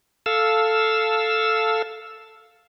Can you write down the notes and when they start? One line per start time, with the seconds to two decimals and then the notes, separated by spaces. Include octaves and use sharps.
0.26 A4 F5 E6